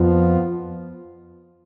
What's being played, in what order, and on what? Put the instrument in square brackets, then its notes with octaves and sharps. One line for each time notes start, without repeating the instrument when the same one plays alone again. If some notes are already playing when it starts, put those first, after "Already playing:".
Already playing: [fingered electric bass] F2 [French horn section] F3 B3 F4